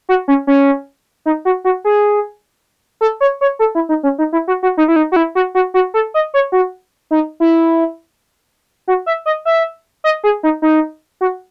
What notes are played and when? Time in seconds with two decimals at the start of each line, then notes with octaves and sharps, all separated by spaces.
0.09 F#4
0.28 C#4
0.47 C#4
1.26 D#4
1.45 F#4
1.64 F#4
1.84 G#4
3.01 A4
3.21 C#5
3.41 C#5
3.59 A4
3.75 E4
3.89 D#4
4.03 C#4
4.18 D#4
4.32 E4
4.48 F#4
4.63 F#4
4.77 D#4
4.88 E4
4.96 D#4
5.12 F#4
5.16 E4
5.35 F#4
5.55 F#4
5.74 F#4
5.94 A4
6.14 D#5
6.34 C#5
6.52 F#4
7.11 D#4
7.40 E4
8.88 F#4
9.06 E5
9.26 D#5
9.45 E5
10.04 D#5
10.24 G#4
10.43 D#4
10.62 D#4
11.21 F#4